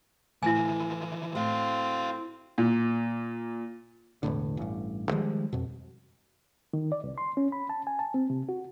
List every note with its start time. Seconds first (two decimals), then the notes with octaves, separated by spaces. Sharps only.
0.43 A2 E3 F3 E4 G#5
1.35 A2 C4 F#4 F5
2.58 A#2
4.23 E1 B1 A2 D3
4.57 A1 G2
5.11 D#3 F3 G3 G#3
5.53 F2 B2
6.73 D#3
6.92 D5
7.04 C2
7.18 C6
7.37 C#4
7.52 B5
7.69 A5
7.87 G#5
7.99 A5
8.14 C4
8.30 C3
8.49 F#4